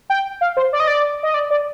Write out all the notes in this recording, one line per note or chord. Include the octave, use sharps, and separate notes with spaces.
G5
F5
C5
D5
D#5
D5
D#5
D5
D5